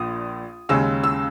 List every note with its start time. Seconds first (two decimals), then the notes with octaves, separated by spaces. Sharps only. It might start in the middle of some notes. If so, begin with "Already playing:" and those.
Already playing: A#1 A#2 D#6
0.69 D#2 C#3 G#3 C#4 E6
1.04 E6